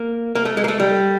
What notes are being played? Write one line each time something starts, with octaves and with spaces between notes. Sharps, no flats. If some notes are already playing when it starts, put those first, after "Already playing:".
Already playing: A#3
A#3
A3
G#3
A#3
A3
G3